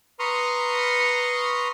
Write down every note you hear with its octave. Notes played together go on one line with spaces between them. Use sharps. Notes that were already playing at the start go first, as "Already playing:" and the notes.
B4 A#5 C6 C#6 D#6 F6